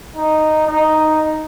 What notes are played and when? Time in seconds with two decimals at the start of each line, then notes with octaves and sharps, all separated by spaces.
0.16 D#4
0.66 D#4